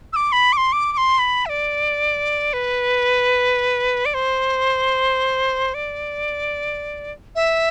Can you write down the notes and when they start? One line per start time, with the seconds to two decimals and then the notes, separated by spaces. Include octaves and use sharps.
0.13 E6
0.16 D6
0.32 B5
0.53 D6
0.57 C6
0.73 D6
0.93 D6
0.97 C6
1.19 B5
1.46 E5
1.49 D5
2.53 B4
4.05 D5
4.14 C5
5.74 D5
7.35 E5